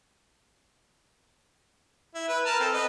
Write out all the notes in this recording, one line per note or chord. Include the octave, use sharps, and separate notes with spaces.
E4
B4
A#4 A5 F6
C4 A4
B4 D#5